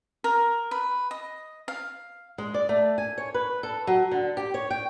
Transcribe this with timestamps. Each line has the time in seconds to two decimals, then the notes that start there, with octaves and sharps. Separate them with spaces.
0.24 A#4
0.71 B4
1.11 D#5
1.68 F5
2.38 G#3
2.54 D5
2.69 A3
2.98 G#5
3.18 C#5
3.34 B4
3.63 A4
3.87 F#3
4.11 D3
4.37 G4
4.54 C#5
4.70 G5